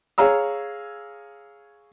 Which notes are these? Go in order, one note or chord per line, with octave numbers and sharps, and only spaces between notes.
G#4 C#5 F5 A#5 E6